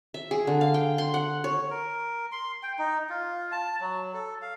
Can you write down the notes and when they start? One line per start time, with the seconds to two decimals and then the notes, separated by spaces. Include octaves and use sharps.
0.14 E5
0.31 G#4
0.47 D3
0.61 F5
0.74 G5
0.98 C6
1.14 F#5
1.44 C#5
1.70 A#4
2.32 C6
2.63 G5
2.79 D#4
3.09 F4
3.52 A5
3.81 F#3
4.14 A4
4.42 F5